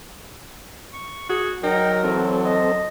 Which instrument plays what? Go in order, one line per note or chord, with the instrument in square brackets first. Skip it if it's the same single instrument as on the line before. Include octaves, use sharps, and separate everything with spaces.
[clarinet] C#6
[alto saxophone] F#4 [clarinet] G#4
[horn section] F#3 [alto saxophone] D#4 [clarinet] A#4 [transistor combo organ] G5
[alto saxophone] E3 [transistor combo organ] C4 A4
[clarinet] D#5